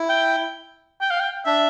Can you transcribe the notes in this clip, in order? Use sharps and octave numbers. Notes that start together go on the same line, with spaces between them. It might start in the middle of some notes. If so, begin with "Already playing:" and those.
Already playing: E4
G5
G5
F5
G5
D4 E5